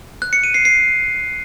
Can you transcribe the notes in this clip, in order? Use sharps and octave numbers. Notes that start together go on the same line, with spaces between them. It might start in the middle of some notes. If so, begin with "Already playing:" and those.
F#6
C#7
D#7
C7
C7